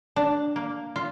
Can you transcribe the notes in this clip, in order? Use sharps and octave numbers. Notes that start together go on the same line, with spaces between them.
D4
A#3
F4